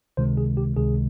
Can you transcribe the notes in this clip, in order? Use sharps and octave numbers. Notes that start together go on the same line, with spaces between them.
C#2 C3 D#3 G#3 C5
G#4
G4
C#2 C3 D#3 G#3 G#4